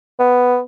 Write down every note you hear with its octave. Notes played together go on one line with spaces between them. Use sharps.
B3